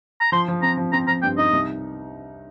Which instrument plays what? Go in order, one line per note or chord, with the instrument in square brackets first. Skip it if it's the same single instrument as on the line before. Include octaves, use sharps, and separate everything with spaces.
[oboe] A#5
[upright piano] F3 [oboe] C6
[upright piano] F3
[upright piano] C4 [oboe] A#5
[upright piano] F3
[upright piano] C4 [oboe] A#5
[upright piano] F3 [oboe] A#5
[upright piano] G2 [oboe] G5
[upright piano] D#4 [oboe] D#5
[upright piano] C2